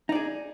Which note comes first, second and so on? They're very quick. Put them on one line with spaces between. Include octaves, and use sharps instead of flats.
D#4 D5 G#4